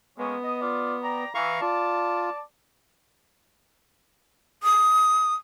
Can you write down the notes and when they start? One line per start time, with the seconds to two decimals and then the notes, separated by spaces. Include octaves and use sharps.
0.18 G#3 A#3 B3 C#4
0.43 D#5
0.61 F4 D5
1.03 D5 G5 A#5
1.35 E3 F5 A#5 C#6
1.61 F4 D5 A5
4.63 D#6